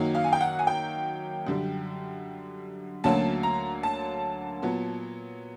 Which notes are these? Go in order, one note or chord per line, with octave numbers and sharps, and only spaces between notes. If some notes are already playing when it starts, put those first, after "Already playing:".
Already playing: F#2 D#3 F#3 A#3
F5
G#5
G5
F#5
G#5
G5
F#2 D3 G3
D2 D3 F#3 A#3 C#4 A5
A#5
A5
A#2 F#3 B3